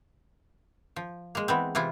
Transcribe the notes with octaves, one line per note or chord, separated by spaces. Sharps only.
F3
G#3 A#3
E3 B3 C4
C3 E3 E4 F4